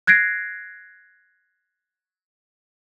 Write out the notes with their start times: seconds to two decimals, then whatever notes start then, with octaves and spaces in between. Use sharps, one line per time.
0.07 F#6 G#6 A#6 C7 D7